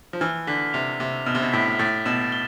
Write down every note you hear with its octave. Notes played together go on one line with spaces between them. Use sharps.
F3
E3 F6
D3 B6
C3 F7
C3 D6
B2 F6
C3
B2
A2 B6
A2 A6
B2 E7
G7